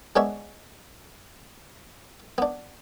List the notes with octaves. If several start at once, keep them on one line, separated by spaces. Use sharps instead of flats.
G#3 B3 D4 C#5 E5
B3 D4